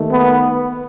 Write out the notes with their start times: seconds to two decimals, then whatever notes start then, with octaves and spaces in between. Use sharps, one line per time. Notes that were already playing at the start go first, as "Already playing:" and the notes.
Already playing: D#2 D#3 A3
0.09 B3